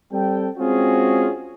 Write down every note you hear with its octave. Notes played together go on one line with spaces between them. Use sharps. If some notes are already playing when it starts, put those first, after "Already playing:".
G3 C4 A4 G5
G#3 C4 C#4 F4 F#4 G#4